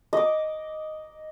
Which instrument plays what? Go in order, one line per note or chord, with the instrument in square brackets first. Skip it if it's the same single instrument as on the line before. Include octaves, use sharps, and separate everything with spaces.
[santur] D#5 D6